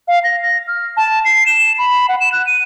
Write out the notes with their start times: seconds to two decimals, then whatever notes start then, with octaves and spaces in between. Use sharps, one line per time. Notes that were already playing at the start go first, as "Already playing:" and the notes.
0.08 F5
0.24 A#6
0.43 A#6
0.68 F6
0.97 A5
1.25 C7
1.46 E7
1.78 B5
2.09 F#5
2.20 E7
2.32 F#6
2.47 D#7